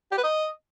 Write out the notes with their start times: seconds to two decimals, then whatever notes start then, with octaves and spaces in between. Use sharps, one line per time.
0.12 G4
0.18 B4
0.24 D#5